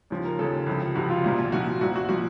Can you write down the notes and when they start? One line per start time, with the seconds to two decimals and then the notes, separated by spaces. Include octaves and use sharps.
0.10 D#2 C#3 F3
0.25 A#4
0.39 D#2 C#3 F3 A4
0.67 C#2 C3 F3
0.95 C#2 C3 F3 F#4
1.10 F4
1.24 C2 A#2 F3
1.52 C2 A#2 F3 F#4
1.81 C2 A#2 F3 F#4
1.96 F#4
2.09 A#2 F3 F#4